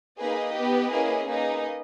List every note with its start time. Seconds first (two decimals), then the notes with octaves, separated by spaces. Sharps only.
0.20 A#3 D#4 G#4 B4 D#5
0.56 B3 G4
0.93 A#3 C#4 E4 G#4
1.28 A#3 D#4 G#4 B4 D#5